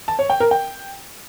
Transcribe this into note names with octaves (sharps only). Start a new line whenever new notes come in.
A5
C#5
G5
A#4
G5